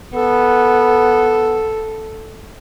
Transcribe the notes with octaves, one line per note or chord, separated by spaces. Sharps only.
B3 A4